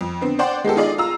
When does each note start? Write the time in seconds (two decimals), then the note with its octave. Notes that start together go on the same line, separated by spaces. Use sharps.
0.01 F2
0.21 D3 B3 C4
0.39 C5 D5 F#5 G5 C6
0.64 G#3 B3 G4 A4
0.76 D#4 F4 G#4 D5 D#5
0.98 F4 A#5 E6